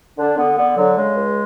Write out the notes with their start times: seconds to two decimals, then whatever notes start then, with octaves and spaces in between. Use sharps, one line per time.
0.18 D3 D4
0.38 D3 B3
0.58 D3 B3
0.77 D3 F#3
0.96 C#3 G#3
1.16 C#2